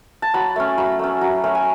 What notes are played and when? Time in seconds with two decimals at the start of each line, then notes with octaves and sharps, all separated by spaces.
0.22 A5
0.34 F#3 B5
0.56 A3 C#4
0.78 F#3 B5
0.99 A3 C#4
1.21 F#3
1.44 A3 C#4
1.55 G#5